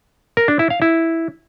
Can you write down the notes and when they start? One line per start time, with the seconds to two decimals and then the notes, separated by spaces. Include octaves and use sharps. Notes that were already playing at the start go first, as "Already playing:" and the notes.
0.37 A#4
0.48 D4
0.59 E4
0.70 F5
0.82 E4